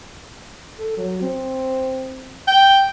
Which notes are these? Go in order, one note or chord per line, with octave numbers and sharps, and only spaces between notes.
A4
F#3
C4
G5